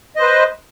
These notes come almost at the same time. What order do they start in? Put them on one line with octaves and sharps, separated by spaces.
D#5 C5 B4